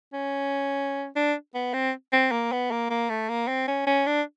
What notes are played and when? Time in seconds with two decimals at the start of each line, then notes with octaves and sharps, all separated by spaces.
0.13 C#4
1.16 D4
1.55 B3
1.73 C4
2.13 C4
2.31 A#3
2.52 B3
2.71 A#3
2.90 A#3
3.09 A3
3.29 A#3
3.48 C4
3.68 C#4
3.87 C#4
4.06 D4